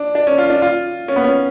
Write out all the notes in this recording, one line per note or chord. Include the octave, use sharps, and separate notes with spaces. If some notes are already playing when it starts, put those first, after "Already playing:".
Already playing: D4
D4
C#4
F4
D4
F4
C#4
B3
C#4